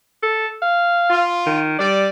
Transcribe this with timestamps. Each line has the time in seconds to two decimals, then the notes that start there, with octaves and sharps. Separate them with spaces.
0.23 A4
0.62 F5
1.10 F4
1.47 D#3
1.79 G3 D5